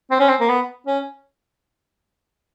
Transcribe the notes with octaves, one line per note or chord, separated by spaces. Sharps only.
C4
C#4
C4
A#3
B3
C#4